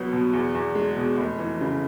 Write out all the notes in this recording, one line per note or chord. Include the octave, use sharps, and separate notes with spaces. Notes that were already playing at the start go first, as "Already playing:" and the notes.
Already playing: C2 F#3 B3
B2
E2
E2
G#3
B2
F1
E3
C#3